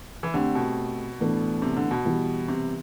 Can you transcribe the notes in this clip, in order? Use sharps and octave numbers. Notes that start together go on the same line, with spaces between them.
E3
D3 A3 C4 G4
B2
A2 E3 B3 D4 A4
C3
D3
B2
E3 G3 B3 E4
C3